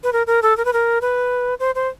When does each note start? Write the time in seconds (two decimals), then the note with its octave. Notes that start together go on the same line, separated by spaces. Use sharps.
0.03 B4
0.13 A#4
0.27 A#4
0.42 A4
0.57 A#4
0.65 B4
0.73 A#4
1.01 B4
1.60 C5
1.75 C5